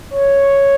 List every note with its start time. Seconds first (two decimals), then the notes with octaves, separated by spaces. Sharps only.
0.11 C#5